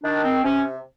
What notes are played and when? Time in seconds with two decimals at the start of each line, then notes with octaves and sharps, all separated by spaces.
0.04 D#3 D4
0.24 C4
0.44 C3 C#4